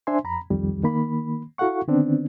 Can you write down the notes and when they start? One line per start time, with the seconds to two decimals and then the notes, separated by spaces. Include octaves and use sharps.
0.07 D4 C5 E5 G#5 C6
0.24 F2 A#5 B5
0.50 C2 F2 D#3 G3
0.84 D#3 A#3 B5
1.58 E4 F#4 A4 F5 F#5 C#6
1.88 D3 D#3 B3 C4 D4